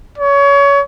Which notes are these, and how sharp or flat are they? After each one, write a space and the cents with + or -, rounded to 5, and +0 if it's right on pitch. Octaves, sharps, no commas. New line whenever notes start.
C#5 +25